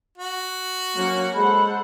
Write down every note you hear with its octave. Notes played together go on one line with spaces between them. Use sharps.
F#4
F#3 A#3 C#4 F#5
G#3 A4 C5 F#5 B5